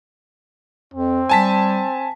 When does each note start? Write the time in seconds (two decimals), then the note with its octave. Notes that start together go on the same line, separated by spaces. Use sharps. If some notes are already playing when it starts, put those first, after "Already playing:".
0.94 F2 C4
1.29 G3 G#5 A5 B6